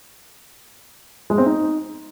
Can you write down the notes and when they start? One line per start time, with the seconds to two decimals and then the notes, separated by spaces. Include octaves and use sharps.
1.30 G#3
1.38 C4
1.46 D#4